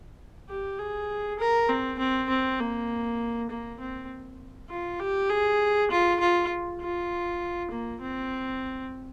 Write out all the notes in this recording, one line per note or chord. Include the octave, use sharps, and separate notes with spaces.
G4
G#4
A#4
C4
C4
C4
A#3
A#3
C4
F4
G4
G#4
F4
F4
F4
A#3
C4